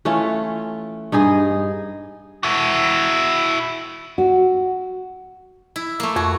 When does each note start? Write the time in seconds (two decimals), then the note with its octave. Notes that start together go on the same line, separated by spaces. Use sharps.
0.05 E3 A3 C#4 F4
1.12 G2 D#4 G#4 D#5
2.43 E4 F#4
4.18 F#4
5.76 E4
6.00 A3 A#3
6.16 F2 F#4